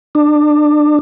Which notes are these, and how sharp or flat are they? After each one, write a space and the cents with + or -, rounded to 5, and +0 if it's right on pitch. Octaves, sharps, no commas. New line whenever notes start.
D4 +25